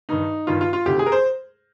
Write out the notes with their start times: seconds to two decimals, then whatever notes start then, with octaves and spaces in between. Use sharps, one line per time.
0.09 G2 D#3 D#4
0.47 G2 D#3 F4
0.61 F4
0.73 F4
0.86 D2 C3 D#3 G4
0.99 G#4
1.06 A#4
1.12 C5